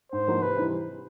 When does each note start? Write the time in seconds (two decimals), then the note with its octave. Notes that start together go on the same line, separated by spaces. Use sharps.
0.12 G#2 C5
0.27 F3 A#3 D#4 F#4
0.41 C3 B4
0.56 E3 G3 C4 D#4